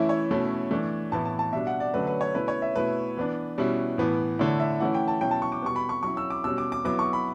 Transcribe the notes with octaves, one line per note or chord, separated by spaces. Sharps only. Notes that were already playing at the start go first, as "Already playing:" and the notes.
Already playing: E3 A3 C#4 E4 E5
C#5
B2 A3 C#4 E4
E3 A3 D4
A2 E3 B3 E4 A5
A5
A5
B2 G3 D4 E5
F#5
D5
D3 F#3 A3 C#4 B4
B4
C#5
B2 A3 C#4 E4 B4
C#5
E5
B2 A3 E4 B4
E3 B3 D4
B2 G3 C#4 E4
A2 E3 B3
D3 A3 E4 C#5
E5
E3 A3 C#4 E4 F#5
G5
A5
B2 F#3 C#4 E4 G5
A5
C#6
D6
B2 G3 B3 C#6
B5
C#6
F#3 C#4 E4 C#6
E6
D6
B2 G3 C#4 E6
D6
D6
F#3 B3 E4 D6
C#6
B5